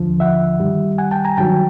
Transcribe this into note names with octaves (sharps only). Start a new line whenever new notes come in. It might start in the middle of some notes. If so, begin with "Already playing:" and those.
Already playing: D#2 D3 F3
E5 F#5
G2 D#3 G3
F#5 G#5
G5 A5
G#5 A#5
G2 D#3 F#3 G5 A5